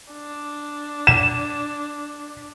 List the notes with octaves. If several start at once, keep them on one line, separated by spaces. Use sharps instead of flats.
D4
E7